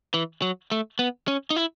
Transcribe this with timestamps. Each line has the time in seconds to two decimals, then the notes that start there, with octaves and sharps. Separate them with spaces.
0.14 E3
0.42 F#3
0.71 A3
0.99 B3
1.28 C#4
1.50 D#4
1.56 E4